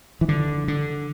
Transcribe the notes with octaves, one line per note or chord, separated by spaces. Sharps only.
E3
D3
D3